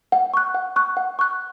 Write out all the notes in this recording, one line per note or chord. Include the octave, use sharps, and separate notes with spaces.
F#5
C#6 F#6
F#5
C#6 F#6
F#5
C#6 F#6